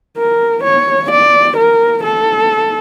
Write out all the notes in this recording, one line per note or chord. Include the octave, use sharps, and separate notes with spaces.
A#4
C#5
D5
A#4
A4